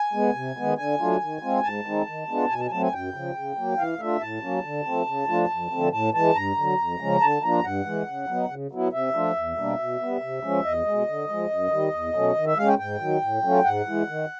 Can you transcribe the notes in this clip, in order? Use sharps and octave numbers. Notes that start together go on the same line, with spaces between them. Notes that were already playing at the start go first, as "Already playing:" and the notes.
Already playing: G#5
G#3 B3
C3
D#3 G#3 B3
D3 G#5
F#3 A3 D4 F4
D#3
G#3 C4 F4
G#2 A5
D#3 G#3 C4 D#4
D#3
G#3 B3 D4 F4
B2 G#5
A5
G#5
F#3 A3 C4 A5
G#5
F#2 G5
C#3 F3
C#3
F#3 A#3
E3 F5
A3 D4 F4 E5
A2 A5
F#3 A#3 C#4
D3
F3 A3 C4
C#3
F3 A3 D4 F4
F2
D3 F3 A3 C4
A2 A5
E3 G#3 A5
G2 A#5
D3 F#3
F2
C#3 F3 G#3 C#4
D3 A5
F3 A#3 D4 F4 A#5
G2 F#5
E3 G#3
C#3
F#3 B3 D#4
C#3
F#3 B3 E4
C3 E5
F3 A3 D4 F4
E2
B2 G3 A#3 D4
B2
G3 B3
C3
F3 G#3 C#4
E2 D#5
B2 G#3
D3
F3 G#3
F#2
D#3 G3
E2
B2 F#3 A3 C#4
D#3
E5
G#3 C#4 F5
G5
G#2 G5
D#3 F#3
A2
F#3 A3 C#4 F4
G#2 F#5
E3 G#3
D#3